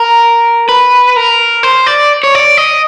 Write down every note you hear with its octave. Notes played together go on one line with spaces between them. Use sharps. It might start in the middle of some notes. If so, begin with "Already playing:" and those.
Already playing: A#4
B4
A#4
C5
D5
C#5
D5
D#5